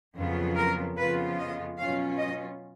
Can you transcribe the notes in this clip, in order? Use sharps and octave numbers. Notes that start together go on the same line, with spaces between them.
F2 C#3 F#3 B3 F4
A#4
F2 C#3 F3 B3 F4 B4
D#5
B2 F#3 C#4 F4 F5
D#5